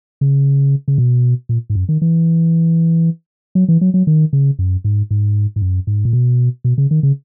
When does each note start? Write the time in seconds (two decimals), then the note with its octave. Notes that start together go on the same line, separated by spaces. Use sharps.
0.21 C#3
0.88 C#3
0.98 B2
1.49 A#2
1.70 G#2
1.75 F#2
1.89 D#3
2.02 E3
3.55 F#3
3.69 E3
3.81 F#3
3.94 F#3
4.07 D#3
4.33 C#3
4.59 F#2
4.84 G#2
5.11 G#2
5.56 G#2
5.62 F#2
5.87 G#2
6.05 A#2
6.13 B2
6.64 B2
6.78 C#3
6.91 D#3
7.03 C#3